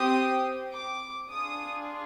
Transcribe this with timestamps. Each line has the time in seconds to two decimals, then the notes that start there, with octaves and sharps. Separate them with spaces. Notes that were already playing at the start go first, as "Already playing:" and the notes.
Already playing: C4 G4 D#6
0.73 D6
1.29 D4 F4 G#4 D#6